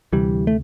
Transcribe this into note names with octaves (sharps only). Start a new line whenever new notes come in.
D2 C3 E3 G3
A3